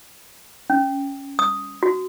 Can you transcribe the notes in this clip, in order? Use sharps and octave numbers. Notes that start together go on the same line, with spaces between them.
C#4
D#6
F#4